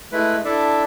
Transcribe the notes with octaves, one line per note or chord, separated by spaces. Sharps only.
G#3 A3 E4 B4
D4 E4 A4 D5 E5